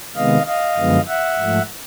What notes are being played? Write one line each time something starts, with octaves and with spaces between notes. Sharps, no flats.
C3 D#3 G#3 B3 D#5 F5
D#5 F5
F#2 D3 F3 G#3 B3
E5 F#5
G#2 F3 A3